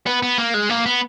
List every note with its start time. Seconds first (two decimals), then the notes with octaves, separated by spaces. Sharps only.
0.06 B3
0.23 B3
0.38 A#3
0.54 G#3
0.69 A#3
0.86 B3